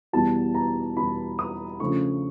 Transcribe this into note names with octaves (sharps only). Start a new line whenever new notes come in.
E2 B2 G3 A5
A#5
E2 B2 G3 B5
D#6
C#3 F3 A3 D4 C#6